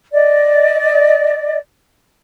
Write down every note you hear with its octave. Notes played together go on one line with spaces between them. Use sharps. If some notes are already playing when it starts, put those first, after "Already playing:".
D5 D#5